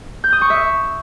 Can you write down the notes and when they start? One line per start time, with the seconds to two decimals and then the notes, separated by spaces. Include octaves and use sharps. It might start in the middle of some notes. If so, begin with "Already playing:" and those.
0.24 G6
0.33 D#6
0.41 C#6
0.50 E5